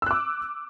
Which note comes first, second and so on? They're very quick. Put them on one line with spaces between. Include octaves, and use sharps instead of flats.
E6 F#6 D6